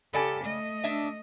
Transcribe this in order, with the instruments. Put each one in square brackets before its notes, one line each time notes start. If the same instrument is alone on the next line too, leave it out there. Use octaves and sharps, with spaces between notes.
[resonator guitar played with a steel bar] C#3 D5 G#5 [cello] G4 A4
[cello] A3 D#5
[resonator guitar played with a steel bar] D4 E5